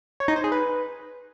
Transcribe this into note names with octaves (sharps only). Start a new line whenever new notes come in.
C#5
D#4
C5
G#4
B4